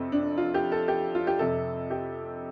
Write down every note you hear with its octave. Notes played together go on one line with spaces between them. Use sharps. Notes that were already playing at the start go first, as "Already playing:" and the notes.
Already playing: F2 C3 C4 A4
D4
F4
G4
A4
G4
F4
G4
F2 C3 A4
G4